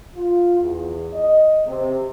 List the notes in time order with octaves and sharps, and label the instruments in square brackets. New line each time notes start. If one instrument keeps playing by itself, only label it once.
[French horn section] F4
E2
D#5
C3